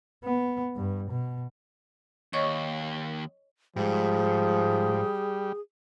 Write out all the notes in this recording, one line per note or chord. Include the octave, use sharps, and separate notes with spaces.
B3
G2
B2
D#2 C#5 D#5 C#6
G#2 F3 G3 G#4